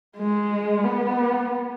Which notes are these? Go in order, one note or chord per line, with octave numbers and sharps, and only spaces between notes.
G#3
B3